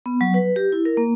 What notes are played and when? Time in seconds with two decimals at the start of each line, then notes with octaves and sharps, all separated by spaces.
0.06 B3
0.21 F#3
0.34 B4
0.56 G4
0.72 E4
0.85 A#4
0.97 A#3